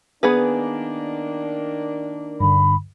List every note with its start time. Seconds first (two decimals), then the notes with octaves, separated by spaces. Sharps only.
0.23 D#3 A#3 B3 D4 G#4 B4
2.40 G2 D3 B5